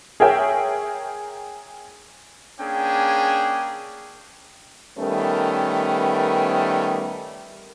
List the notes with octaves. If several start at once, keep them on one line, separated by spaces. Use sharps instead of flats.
G#4 A#4 C#5 E5 G5
A#3 C#4 D4 G#4 G5
D#3 G3 A3 B3 C#4 A#4